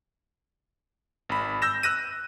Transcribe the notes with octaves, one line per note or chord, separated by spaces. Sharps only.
G#1 B5
E6 G6 A#6 E7
E6 F#6 A#6 D#7